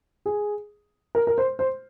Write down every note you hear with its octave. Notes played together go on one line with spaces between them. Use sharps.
G#4
A#4
A#4
C5
C5